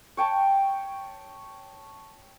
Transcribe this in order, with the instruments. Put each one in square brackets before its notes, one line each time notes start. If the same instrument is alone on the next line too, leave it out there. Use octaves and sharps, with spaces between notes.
[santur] C#5 G5 A5 C#6